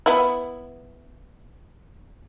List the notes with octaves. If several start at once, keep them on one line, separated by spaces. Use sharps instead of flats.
B3 E4